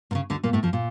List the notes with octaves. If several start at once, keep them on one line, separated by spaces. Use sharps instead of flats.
A#2
C#3
D2 D3
A#2 A#3
A2 A3
F2 F3
A#2